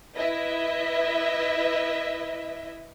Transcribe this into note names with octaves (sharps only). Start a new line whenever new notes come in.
E4 B4 D#5 E5